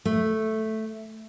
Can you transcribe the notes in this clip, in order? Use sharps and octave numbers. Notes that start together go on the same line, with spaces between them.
A3